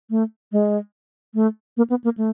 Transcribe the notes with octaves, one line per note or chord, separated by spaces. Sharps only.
A3
G#3
A3
A#3
B3
A#3
A3